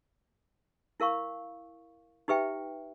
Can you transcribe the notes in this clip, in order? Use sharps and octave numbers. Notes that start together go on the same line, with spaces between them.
E4 A#4 F5 C#6
D#4 G4 B4 E5 G5